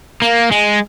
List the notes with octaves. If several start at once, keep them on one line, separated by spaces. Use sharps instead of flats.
A#3
G#3